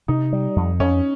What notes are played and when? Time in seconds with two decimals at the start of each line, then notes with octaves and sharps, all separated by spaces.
0.08 C3 D#4
0.33 G3
0.56 F2
0.79 F2 C#4